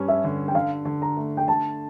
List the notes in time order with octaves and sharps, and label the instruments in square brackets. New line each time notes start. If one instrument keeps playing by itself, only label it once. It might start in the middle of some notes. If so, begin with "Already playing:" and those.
Already playing: [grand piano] G2 G3 C#4
[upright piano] E5
[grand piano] D3
[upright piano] G5
[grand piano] D3 [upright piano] F5
[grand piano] D3
[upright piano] A#5
[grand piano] A3
[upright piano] G5
[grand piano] D3 [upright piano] A5